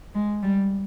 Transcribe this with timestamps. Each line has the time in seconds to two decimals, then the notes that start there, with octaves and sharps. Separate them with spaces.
0.15 G#3
0.42 G3